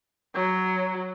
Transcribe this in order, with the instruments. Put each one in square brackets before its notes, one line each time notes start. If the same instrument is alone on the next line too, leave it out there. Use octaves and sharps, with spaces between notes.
[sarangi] F#3